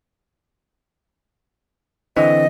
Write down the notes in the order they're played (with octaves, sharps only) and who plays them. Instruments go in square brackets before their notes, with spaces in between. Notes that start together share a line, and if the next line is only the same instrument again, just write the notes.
[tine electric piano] D3 E3 C4 [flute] D#5